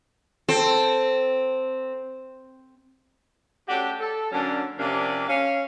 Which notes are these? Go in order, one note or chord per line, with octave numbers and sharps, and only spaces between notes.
C4 A4
A3 C#4 D4 F#4 G4
A4
D3 F#3 A#3 C#4 D4
C3 F3 A#3 C#4 D4
C#4 F5